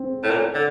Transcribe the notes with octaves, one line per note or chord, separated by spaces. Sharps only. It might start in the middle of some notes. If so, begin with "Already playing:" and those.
Already playing: C4
A2
A#2
A2
D3